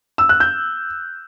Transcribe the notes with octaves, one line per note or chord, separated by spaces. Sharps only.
E6
F#6
G6